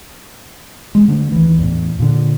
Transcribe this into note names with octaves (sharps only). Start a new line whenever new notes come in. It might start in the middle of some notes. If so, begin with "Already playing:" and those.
G#3
D3 A3 D4
D#2 E3
E2 A2
A#2 D3